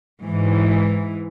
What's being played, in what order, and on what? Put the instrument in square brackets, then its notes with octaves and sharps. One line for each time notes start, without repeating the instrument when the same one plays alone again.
[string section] G#2 E3